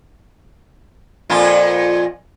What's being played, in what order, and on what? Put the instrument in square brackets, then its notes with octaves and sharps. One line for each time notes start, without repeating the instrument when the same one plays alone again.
[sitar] F2 A#2 F4